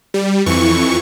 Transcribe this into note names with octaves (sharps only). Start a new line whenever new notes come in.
G3
F2 E3 C#6